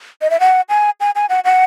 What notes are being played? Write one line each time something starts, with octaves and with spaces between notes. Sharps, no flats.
D#5
E5
F#5
G#5
G#5
G#5
F#5
F#5